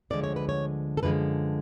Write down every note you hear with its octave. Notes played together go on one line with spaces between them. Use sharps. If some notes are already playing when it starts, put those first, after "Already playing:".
D2 D3 F3 G#3 D5
C#5
B4
C#5
A4
F#2 D3 F3 G#3 B4